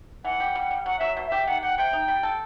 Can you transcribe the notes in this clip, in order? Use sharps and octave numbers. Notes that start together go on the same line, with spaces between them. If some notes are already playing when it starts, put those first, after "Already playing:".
E3 F#5
G4
G3
G3
F#3 F#5
F#3 E5
B2
E5
G4
D#3 F#5
G4 F#5
C3 G5
D#4
G3
A4